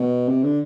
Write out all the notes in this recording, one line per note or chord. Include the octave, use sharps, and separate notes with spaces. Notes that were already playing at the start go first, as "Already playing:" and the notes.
Already playing: B2
C3
D3